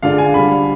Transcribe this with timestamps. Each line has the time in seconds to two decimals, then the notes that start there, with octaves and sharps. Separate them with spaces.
0.03 D3 G#3 D4 F4 F5
0.18 G#5
0.34 D3 G3 D4 B5